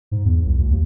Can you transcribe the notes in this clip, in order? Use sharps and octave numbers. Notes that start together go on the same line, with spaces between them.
G#2
E2
C2
D2
D#2